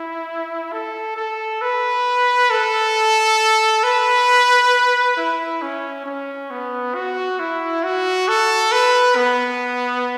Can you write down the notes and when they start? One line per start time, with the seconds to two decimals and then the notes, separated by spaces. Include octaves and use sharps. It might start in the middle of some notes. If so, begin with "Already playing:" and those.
Already playing: E4
0.72 A4
1.17 A4
1.62 B4
2.50 A4
3.84 B4
5.17 E4
5.62 C#4
6.06 C#4
6.51 B3
6.95 F#4
7.39 E4
7.83 F#4
8.28 A4
8.72 B4
9.16 B3